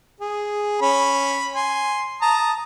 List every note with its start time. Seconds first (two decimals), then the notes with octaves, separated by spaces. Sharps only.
0.20 G#4
0.82 C#4 B5
1.55 G#5 C6
2.22 A5 A#5 D#6